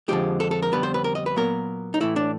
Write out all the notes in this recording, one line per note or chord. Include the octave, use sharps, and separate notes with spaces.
F2 D3 F3 G#3 G4
A4
A4
A#4
F2 D3 G3 B3 B4
C5
B4
A#4
D#5
B4
A#2 F#3 B3 A#4
D#4
A2 E3 A3 E4
D4